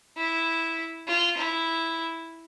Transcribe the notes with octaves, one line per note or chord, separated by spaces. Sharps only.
E4
F4
E4